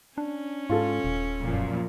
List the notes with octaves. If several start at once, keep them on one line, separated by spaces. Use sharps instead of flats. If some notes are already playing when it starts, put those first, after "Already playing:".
C#4 D4
G#2 F4 A4
D#1
F#2 A#2 F3